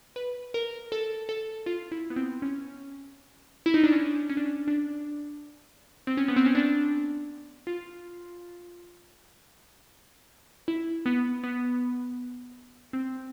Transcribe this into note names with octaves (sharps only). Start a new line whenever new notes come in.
B4
A#4
A4
A4
F4
E4
B3
C4
C#4
E4
D#4
D4
C#4
C#4
D4
C#4
D4
C4
C#4
B3
C4
C#4
D4
F4
E4
B3
B3
C4